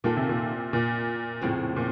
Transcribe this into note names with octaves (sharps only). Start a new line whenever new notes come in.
A#2 D#3 A#3 F4 A4
C3
A#2
A#2
F2 A2 C#3 F3 C4
A#2